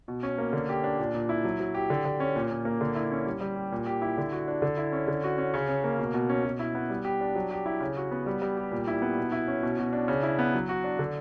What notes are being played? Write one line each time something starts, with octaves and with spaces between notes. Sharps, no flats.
B2
C#4
A#3
D3
G4
D4
A#2
A#2
E4
F#3
F#3
G4
D3
D3
C#4
A#2
A#2
A#3
D3
E4
C#4
G3
G3
G4
A#2
G4
E4
D3
F#4
D4
D3
E4
C#4
D3
F#4
C#4
C#3
C#4
A#3
B2
B2
C#4
B2
E4
B3
G3
G4
D4
F#3
G4
E4
C#3
F#4
B3
G3
G3
G4
A#2
E4
B3
B2
E4
C#4
B2
B2
D4
C#3
E4
B3
F#3
F#4
D4
D3